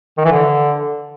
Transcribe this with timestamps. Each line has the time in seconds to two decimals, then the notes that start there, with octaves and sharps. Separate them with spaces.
0.18 D#3
0.25 E3
0.32 D3